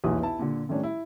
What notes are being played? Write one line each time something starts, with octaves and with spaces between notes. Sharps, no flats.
B1 E2 A#2 E3 D#6
B3 E4 A5
A#2 D3
A2 D#3 G3 C#4 D4
E4